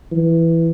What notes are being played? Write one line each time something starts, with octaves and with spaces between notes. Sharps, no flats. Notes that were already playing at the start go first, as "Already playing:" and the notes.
E3